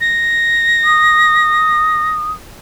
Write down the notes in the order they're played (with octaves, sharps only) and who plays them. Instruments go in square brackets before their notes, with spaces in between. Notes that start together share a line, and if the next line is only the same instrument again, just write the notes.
[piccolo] A#6
[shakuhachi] D#6